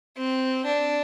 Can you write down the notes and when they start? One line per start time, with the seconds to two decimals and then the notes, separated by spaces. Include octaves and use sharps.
0.17 C4
0.66 D4